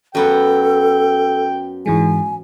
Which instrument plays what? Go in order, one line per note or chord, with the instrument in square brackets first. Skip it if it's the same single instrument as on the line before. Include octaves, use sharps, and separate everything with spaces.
[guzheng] F#2 B3 F#5 [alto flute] A4 [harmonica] G5
[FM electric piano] G#2 E3 G#3 [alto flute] G#5